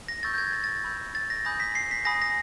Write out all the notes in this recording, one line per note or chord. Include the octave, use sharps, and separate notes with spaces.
A#6
C#6 E6 G6 A6
G6
G#6
A6
A6
B5 E6 G6
A6
A#6
G#5 B5 D#6 G6 A#6
B6
C7
B6
G#5 B5 D#6 A#6
A#6